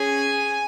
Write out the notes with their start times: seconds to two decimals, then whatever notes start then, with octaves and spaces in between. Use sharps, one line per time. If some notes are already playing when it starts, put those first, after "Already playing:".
Already playing: C#4 G#4 G#5